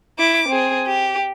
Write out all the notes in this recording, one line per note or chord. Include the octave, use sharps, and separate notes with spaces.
E4 D6
C4 G#4
G4